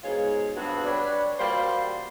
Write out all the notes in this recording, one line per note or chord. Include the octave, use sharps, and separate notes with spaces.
G#2 B2 F4 G#4 C#5
G2 B3 C4 F#4
G3 D4 B4 C#5 D5
G3 A#3 F4 F#4 C5